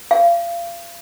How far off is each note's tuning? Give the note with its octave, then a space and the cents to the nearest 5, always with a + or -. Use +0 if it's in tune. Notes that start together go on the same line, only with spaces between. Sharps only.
F5 -30